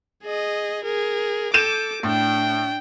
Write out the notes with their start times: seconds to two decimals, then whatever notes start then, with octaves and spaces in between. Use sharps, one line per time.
0.24 G#4 D#5
0.85 G#4 A#4
1.54 A4 D6 G6 D#7 E7
2.03 A2 D4 G5